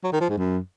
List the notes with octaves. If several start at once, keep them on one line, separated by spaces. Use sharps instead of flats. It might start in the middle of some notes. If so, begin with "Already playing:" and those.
F#3
D#3
F3
G#2
F#2